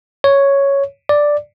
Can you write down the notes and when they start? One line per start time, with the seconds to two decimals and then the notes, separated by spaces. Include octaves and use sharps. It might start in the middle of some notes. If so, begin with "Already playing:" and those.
0.24 C#5
1.09 D5